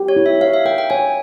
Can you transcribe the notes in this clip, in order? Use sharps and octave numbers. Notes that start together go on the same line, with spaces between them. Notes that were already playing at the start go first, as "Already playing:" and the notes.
Already playing: G4
C#5
E4
E5
C#5 F5
E5
A#4 G5
G5
C#5 G#5